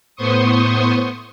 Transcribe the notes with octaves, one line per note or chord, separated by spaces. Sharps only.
A2 B3 C5 C6 C#6 D#6